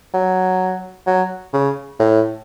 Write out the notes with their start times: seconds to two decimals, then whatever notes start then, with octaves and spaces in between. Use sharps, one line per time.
0.14 F#3
1.07 F#3
1.54 C#3
2.00 A2